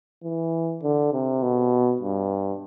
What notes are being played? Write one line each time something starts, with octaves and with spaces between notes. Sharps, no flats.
E3
D3
C3
B2
G2